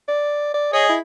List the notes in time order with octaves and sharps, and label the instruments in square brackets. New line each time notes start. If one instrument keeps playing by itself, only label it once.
[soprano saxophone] D5
D5
[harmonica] G#4 D#5 [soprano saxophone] C#5
[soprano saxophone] E4